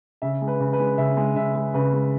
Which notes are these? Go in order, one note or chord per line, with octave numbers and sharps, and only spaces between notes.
C#3 E5
G#3
B4
C#3
B4
G#3
C#3 E5
G#3
C#3 E5
G#3
C#3 B4
G#3